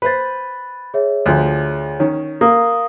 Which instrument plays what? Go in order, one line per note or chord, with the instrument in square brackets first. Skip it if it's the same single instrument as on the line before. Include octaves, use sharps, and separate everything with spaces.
[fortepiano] B4 C5 [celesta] B5 A6
[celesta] G#4 C#5 E5
[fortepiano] D2 F3
D#3 C#4
[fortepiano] A#3 [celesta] F5 D#6